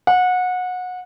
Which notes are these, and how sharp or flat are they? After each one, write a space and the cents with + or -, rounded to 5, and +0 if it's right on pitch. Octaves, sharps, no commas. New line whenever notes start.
F#5 -25